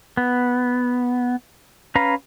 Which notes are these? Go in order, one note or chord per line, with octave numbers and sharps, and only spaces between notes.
B3
C#4 B4 F5 A#5